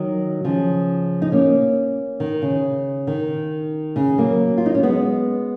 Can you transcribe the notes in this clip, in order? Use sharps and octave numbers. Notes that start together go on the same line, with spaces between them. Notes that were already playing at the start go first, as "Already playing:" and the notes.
Already playing: D#3 F#3
C#3 F3
D#4
A#3 C#4
D#3
C#3
D#3
C#3
F#3 A#3
F4
D#4
C#4
G#3 B3